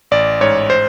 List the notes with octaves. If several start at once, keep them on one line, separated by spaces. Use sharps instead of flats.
A1 D5
G#2 C#5
C5